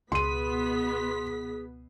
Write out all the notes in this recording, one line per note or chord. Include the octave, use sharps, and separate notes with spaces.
C#2 B2 B3 G#4 C6 B6 D#7